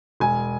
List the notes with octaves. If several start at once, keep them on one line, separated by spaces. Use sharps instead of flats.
E1 G#5